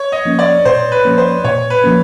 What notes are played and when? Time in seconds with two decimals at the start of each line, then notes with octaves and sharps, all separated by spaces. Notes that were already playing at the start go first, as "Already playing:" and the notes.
Already playing: C#5
0.12 D#5
0.25 F3 A#3 C#4
0.39 D5
0.65 A#2 C5
0.92 B4
1.05 F3 A#3 C#4
1.18 C5
1.44 A#2 C#5
1.70 B4
1.84 F3 A#3 C#4